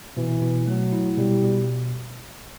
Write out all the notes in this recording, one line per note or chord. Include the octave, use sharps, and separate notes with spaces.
B2 E3
B2
F#3 A3
E4
B2 G3
B2